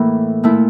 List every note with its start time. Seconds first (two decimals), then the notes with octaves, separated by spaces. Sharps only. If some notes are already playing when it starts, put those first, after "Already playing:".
Already playing: A2 E3 A#3 E4
0.44 A#2 A3 E4